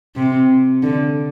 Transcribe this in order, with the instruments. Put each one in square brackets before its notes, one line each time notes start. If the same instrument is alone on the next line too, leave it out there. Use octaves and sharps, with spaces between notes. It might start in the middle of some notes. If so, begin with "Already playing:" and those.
[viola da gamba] C3
D3